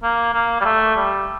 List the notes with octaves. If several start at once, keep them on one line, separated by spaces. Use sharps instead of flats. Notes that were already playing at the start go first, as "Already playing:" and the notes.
A#3
A#3
G3
A3
G3